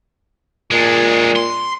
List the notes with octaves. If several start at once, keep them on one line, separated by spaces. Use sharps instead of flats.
A#2 G#3 D4
C6